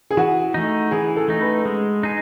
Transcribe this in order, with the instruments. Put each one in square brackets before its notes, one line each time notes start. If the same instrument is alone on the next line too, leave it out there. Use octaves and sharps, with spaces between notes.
[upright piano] G#4
[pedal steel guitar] E3 [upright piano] F#4
[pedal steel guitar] A3 D#4
[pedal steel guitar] E3 [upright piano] G#4
[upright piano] A4
[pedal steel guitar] A3 D#4
[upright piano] B4
[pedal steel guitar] G#3
D#4 G#4